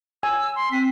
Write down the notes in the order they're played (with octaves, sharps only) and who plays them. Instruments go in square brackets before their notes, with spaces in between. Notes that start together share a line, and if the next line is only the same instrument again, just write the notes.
[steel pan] G#5 [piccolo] E6
[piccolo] C6
[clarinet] C4 [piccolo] B6